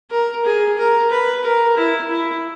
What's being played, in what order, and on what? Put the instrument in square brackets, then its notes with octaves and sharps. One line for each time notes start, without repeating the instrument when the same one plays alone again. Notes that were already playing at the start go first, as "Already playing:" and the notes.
[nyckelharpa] A#4
G#4
A#4
B4
A#4
E4
E4